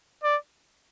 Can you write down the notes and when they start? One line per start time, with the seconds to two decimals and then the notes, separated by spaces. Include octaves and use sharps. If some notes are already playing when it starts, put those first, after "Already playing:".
0.23 D5